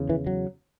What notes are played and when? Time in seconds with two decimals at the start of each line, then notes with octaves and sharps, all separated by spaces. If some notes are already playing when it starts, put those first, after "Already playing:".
Already playing: E2 C#3
0.09 E3
0.27 F#3